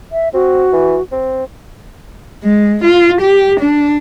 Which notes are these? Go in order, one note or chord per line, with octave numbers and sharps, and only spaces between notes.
E5
C4 F#4
E3
C4
G#3
F4
G4
D4